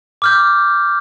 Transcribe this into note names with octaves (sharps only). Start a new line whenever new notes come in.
D6 F6 G6